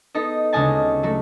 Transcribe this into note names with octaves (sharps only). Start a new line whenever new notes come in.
B3 D#4 A4 D#5
D2 C#3 G#3 D#5 G#5 A5
F#3 A3